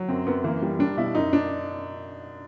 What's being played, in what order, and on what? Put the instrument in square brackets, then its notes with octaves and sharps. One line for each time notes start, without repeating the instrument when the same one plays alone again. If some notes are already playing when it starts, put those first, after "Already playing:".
Already playing: [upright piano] F#3
F#2 C4
F#2 B3
E3 A#3
G3
G3 D4
B2 E4
F#2 D#4
D4